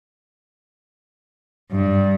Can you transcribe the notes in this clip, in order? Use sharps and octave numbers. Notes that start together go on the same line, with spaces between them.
G2